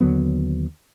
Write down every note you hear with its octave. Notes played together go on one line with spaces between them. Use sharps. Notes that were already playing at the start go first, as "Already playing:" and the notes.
D#2 D3 F#3 B3